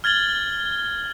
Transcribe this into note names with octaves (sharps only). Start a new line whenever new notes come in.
F6 G#6 A6 F#7 G7